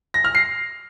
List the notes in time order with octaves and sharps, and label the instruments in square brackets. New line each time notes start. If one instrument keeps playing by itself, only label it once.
[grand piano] A#6
F6
C7